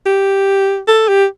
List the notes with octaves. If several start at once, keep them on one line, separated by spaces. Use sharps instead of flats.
G4
A4
G4